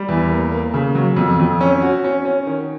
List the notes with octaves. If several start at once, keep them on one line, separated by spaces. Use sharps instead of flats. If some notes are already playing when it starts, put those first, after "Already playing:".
Already playing: G3
E2
A#3
A#3
C#3
F#3
F2
F2
C#4
F#4
C#4
C#4
D#3